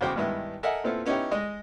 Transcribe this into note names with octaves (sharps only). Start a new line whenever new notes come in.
E2 C#3 F#4 C5 G5 D6
G2 D#3 G#3 B3 E4
A4 A#4 D#5 E5 F#5 G#5
A#2 B3 C4 E4 F4 A4
B3 C#4 D#4 E4 G4 C#5
G#3 D#5